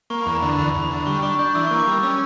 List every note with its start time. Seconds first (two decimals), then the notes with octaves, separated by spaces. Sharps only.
0.10 A#3 C#6
0.23 B5
0.26 E2
0.35 A#5
0.42 D3 B5
0.58 E2 B5
0.74 E2
0.82 B5
0.91 D3
1.06 G3 C#6
1.22 D4 C#6
1.39 D4 G6
1.55 E3 E6
1.67 C#6
1.71 A#3
1.80 D6
1.87 G3 E6
2.03 C#4 E6